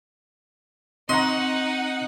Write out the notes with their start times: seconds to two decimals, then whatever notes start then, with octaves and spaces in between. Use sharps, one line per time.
1.09 C4 D#4 D#5 F#5 A#5 C6